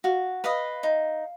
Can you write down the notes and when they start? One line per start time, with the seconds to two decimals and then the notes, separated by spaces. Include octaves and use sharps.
0.04 F#4 F5
0.44 B4 D#5 F5
0.83 D#4